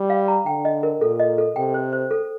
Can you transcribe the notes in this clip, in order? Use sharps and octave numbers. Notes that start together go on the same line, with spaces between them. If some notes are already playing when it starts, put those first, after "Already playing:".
Already playing: G3
F5
A#5
D3 G5
D#5
A#4
A#2 A4
D#5
A4
C3 G5
C5
C5
A4